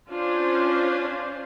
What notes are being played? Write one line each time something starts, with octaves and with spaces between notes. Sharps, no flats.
C#4 D4 F4 C5